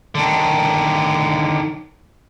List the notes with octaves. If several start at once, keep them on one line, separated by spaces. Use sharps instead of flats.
D3 D#3